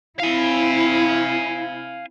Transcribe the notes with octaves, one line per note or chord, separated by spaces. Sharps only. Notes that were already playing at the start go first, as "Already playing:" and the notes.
C4 E4 F5 G#5